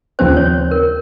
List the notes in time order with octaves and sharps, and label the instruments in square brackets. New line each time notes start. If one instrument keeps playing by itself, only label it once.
[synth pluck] D#2 C#3 F3 C4 [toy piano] C5
[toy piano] C#5
A#4